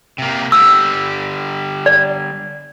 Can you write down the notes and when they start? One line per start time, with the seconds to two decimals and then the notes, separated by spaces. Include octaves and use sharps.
0.18 C3 A#3
0.52 D3 G3 E6
1.86 D5